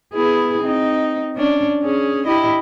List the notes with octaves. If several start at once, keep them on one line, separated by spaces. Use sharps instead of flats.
B3 E4 G#4
C4 D#4
C#4 D4
C#4 G#4
E4 G4 D#5